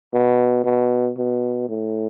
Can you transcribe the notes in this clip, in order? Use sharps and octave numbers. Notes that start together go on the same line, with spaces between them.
B2
B2
B2
A2